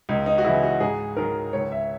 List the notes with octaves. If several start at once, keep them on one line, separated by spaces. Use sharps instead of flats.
C#2 D#4
D#4
F#4
C#3 E3 E4
F#4
G#2 G#4
D#3 F#3 A#4
C#2 C#5
E5